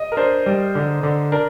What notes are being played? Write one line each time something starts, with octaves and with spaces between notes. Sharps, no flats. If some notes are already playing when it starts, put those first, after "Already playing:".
Already playing: D#5
A#4
D4 C5
G3
D3
D3
D4 A#4